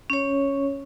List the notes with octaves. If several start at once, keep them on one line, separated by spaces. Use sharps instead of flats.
C#4 C#5